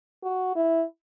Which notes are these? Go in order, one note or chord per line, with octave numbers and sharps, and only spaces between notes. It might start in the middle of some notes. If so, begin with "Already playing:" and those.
F#4
E4